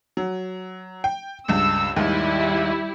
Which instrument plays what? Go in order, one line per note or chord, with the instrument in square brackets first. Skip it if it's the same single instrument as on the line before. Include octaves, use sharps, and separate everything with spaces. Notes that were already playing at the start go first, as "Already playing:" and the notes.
[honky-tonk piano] F#3
G5
[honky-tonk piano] C#2 G2 [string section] E6
[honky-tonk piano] D#2 G#2 D#3 [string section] G3 E4